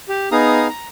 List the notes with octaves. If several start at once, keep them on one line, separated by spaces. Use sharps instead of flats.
G4
B3 D#4 G#4 F5 A#5 D#6
A#5